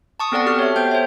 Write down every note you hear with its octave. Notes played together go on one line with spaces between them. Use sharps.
A5 C#6 D#6
B3 C4 A4 D5 F#5 A5
F#4 G4 F6
C#5 E5
B3 A4 C5 G5 G6
C5 C#5 E5